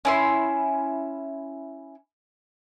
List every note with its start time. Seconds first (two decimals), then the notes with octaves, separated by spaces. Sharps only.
0.05 C#4 E4 C6